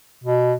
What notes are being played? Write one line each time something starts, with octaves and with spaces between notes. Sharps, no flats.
B2